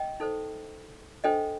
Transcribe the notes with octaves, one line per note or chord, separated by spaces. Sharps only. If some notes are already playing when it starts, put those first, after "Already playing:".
Already playing: D#5 G5
D#4 A4 C5
D4 A4 C5 D#5 G5